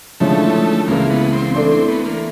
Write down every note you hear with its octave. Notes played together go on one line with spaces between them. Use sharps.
D3 F3 G#3 A3 C#4 E4
C#2 C#3 E3 A#3
B3
C4
E3 A3 C4 D4
C4
B3
A#3